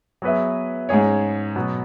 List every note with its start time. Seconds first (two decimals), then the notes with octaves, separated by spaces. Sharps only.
0.22 F#3 B3 G#4 B4 E5
0.89 G#2 G#3 C#4 G#4 C#5
1.56 B2 F#3 B3